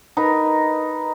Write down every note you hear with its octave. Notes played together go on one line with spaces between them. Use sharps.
D#4 A#4 B4